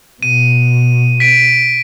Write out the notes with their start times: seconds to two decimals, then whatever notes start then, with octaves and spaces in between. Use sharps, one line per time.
0.23 B2 D#7
1.20 B6 D7